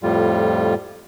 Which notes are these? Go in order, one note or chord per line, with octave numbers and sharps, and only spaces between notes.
F2 A2 G3 F4